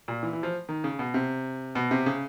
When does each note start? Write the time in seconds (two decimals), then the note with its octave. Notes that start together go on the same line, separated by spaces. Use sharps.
0.08 A#2
0.23 E3
0.33 E3
0.43 F3
0.69 D#3
0.84 C#3
0.99 B2
1.14 C3
1.75 B2
1.91 C3
2.06 C#3